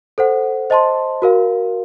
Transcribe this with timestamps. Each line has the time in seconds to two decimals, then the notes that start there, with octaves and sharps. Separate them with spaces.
0.18 A4 C5 F#5
0.70 C5 D#5 A5 C6
1.22 F#4 A#4 F5